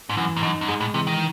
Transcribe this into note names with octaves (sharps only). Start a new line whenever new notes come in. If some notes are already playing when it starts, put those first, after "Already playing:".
G#2
F#2 E3
G#2
F#2 D#4
F#2
G#2 G#3
A2
C3 E3
D#3